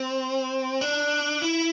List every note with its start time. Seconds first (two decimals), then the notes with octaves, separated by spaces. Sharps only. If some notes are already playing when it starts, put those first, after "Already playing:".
Already playing: C4
0.81 D4
1.42 E4